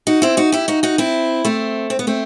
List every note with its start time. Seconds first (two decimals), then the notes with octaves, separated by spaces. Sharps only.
0.07 D#4 F#4
0.22 C4 E4
0.37 D#4 F#4
0.52 E4 G4
0.68 D#4 F#4
0.83 D#4 F#4
0.98 C4 E4
1.45 A3 C4
1.90 C4
1.99 B3
2.07 A3 C4